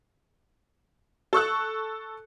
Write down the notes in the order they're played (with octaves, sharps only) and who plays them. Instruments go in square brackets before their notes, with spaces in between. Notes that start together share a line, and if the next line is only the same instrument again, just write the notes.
[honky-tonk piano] A4 C#6 E6 F#6